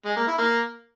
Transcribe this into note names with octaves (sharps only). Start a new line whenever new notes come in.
G#3
A#3
E4
A#3